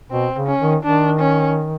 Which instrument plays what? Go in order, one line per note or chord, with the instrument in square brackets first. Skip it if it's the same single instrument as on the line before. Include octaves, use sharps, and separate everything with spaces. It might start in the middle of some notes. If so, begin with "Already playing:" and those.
[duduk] B2 [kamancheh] C4
[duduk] C#3
[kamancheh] C#4
[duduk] D#3
[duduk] D#3 [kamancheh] D4
[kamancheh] C#4